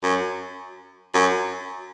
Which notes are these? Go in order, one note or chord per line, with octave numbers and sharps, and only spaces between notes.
F#2
F#2